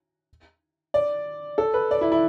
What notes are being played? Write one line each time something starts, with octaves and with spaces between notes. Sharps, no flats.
D5
A4
B4
D5
E4
E4